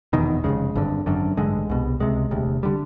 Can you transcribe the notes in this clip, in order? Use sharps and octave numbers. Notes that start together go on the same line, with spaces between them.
F1 E2 B2 D#3
F1 E2 C#3 G#3
G#1 G2 D3
G#1 F#2 D3
A1 G2 D3 G#3
C2 B2
C#2 C3 G#3
E1 D2 C3
D3 G3